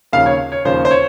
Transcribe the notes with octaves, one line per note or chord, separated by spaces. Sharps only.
D#2 C#3 F3 F5
C#5
C#5
D#2 C#3 F3 C5
C5
C#5